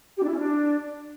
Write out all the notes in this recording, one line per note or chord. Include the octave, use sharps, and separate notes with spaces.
G4
D4
E4
C#4
D4